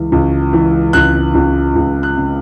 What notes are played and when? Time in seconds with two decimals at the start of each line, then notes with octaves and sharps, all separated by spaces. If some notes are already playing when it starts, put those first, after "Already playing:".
Already playing: C#2 E3
0.12 C#2
0.53 E3
0.93 C#2 F#6
1.35 C#2
1.76 C#2
2.03 F#6
2.17 C#3